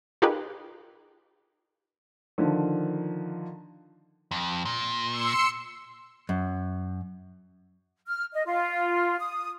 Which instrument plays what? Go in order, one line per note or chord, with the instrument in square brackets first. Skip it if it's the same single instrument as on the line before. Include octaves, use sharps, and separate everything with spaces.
[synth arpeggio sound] D#4 F4 G4 G#4 A#4 B4
[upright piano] D3 D#3 F3
[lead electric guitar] F2
A#2
[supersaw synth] C6 E6 C#7
[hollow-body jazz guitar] F#2
[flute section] F6
D#5
F4
D#6